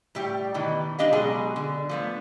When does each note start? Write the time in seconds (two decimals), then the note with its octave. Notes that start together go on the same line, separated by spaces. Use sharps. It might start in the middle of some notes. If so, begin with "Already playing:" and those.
0.15 A2 G3 G4
0.54 B2 D#3 E3
0.99 D4 G4 D#5 F5
1.13 B2 F#3 G#3 G#4 G#5
1.56 D3
1.89 F3 A3 B3